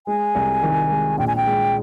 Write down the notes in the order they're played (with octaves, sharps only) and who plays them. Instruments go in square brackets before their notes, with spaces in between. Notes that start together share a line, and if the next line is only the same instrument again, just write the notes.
[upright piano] G#3 [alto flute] G#5
[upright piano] C2
D#3
G#3
[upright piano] A#1 [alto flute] G5
[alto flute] G#5
G5
[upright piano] G#3